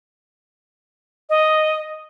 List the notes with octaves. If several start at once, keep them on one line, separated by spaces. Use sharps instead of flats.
D#5